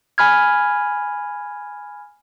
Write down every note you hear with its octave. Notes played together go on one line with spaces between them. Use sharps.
G#5 B5 F6 G#6